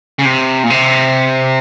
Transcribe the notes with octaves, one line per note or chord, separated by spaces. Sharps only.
C#3
C3
A#2
C3